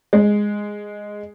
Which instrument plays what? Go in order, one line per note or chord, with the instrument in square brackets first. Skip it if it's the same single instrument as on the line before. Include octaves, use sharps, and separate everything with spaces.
[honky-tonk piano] G#3